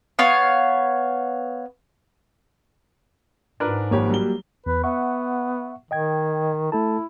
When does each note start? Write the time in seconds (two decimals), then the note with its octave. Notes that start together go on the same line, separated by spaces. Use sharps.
0.19 B3 C#5 F5
3.60 G#2 D4 A#4 B4
3.91 G#1 F3 A#3 G4 C#5
4.10 F#3 G3 G7
4.66 E2 B4
4.84 B3 E5 F#5 C#6
5.91 D#3 D#5 G5 G#6
6.72 A3 E4 A4 A5